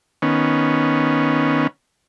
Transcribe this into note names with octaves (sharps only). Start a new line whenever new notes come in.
D#3 B3 C#4